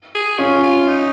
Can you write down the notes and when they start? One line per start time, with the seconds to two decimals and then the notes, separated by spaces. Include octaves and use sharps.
0.15 G#4
0.39 C#4 F4
0.63 F4
0.88 D#4